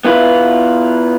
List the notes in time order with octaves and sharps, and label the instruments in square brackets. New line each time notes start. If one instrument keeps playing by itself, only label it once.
[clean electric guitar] B3 E4 F4 B4